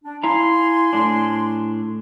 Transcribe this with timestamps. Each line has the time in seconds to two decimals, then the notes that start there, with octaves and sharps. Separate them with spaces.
0.04 D4
0.23 E4 F5 G#5 A#5 C6
0.93 A2 D4